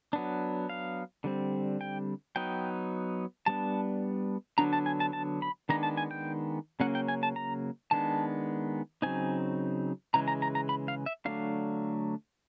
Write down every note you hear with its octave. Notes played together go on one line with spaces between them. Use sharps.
F#3 B3 D4
F5
D3 G3 C4
G5
F#3 B3 D#4 G5
G3 B3 D4 A5
D3 F#3 B3 D4 A#5
A5
G#5
A5
A5
B5
D#3 G#3 B3 D4 A#5
A5
G#5
G5
C#3 F#3 A#3 C#4 F#5
G5
G#5
A5
A#5
D#3 G#3 B3 D4 A5
C#3 F#3 A3 C4 D#4 G#5
C#3 E3 G#3 A#5
A#5
A#5
A#5
B5
F5
E5
D3 F#3 A3 D4 F5